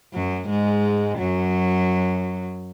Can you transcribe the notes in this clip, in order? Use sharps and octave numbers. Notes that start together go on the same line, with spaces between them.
F#2 F#3
G#2 G#3
F#2 F#3